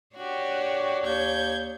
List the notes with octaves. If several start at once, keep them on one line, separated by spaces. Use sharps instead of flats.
D4 F#4 G4 C#5
D#2 G6 G#6